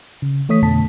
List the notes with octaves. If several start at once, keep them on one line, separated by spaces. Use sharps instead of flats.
C#3
E3 A3 C#5 D#6 B6
F2 B2 D3 A3 A5 B6